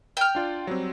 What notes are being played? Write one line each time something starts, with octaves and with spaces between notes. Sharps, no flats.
G5 F6
D4 F4 D5
F#3 G3 C4